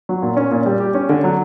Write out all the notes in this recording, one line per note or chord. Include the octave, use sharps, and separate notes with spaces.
F#3
A#2
C#4
A#2
G3
G4
C#4
D3
F#3